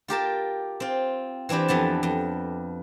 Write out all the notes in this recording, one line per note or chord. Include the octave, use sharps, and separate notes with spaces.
F4 G4 A#4 A5
C4 F4
E3 C4 D4 E4 G4
F2 E3 B3 A5
F2